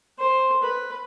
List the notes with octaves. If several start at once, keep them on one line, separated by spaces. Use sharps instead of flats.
C5
B4